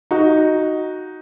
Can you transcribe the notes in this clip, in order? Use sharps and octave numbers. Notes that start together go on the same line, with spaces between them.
D#4 F#4